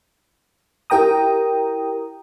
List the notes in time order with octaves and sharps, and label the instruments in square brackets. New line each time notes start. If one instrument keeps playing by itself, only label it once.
[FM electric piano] E4 G4 A#4 G5 A#5 D#6